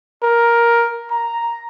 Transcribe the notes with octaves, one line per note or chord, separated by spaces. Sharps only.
A#4
A#5